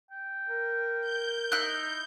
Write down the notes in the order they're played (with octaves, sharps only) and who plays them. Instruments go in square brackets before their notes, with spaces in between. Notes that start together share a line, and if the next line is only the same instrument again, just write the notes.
[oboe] G5
[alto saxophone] A#4
[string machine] G6
[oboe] D#4 [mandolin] E4 F#6